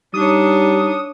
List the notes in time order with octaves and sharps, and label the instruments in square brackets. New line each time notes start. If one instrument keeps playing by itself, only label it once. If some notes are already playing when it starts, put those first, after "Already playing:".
[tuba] G3 [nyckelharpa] D4 C#5 [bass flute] D#4 [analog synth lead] D#6